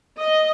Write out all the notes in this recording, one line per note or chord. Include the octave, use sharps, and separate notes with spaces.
D#5